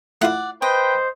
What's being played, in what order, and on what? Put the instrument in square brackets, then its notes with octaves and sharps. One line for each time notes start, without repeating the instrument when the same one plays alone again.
[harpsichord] A3 E4 F4 [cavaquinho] D5 F#5
[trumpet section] B4 G5 [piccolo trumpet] C5 [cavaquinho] D#5